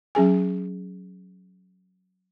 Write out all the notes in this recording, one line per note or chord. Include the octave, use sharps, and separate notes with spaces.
F#3 C#4 G#4 G#5